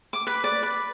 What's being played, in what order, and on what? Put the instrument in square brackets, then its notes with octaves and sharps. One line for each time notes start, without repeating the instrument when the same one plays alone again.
[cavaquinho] D6
B4
D5
B4